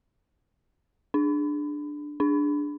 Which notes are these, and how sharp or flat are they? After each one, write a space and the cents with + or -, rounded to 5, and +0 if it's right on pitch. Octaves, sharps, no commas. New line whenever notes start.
D4 +10
D4 +0